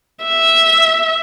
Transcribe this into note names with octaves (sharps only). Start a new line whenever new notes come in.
E5